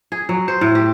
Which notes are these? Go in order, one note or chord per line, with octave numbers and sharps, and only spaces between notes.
G#4
F#3
C5
A2
G4